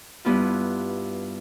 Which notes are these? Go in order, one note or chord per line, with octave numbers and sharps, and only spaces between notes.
G2 B3 E4 F4